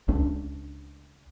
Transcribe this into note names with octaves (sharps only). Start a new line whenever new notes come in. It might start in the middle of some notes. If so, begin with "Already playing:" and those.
C#2 D4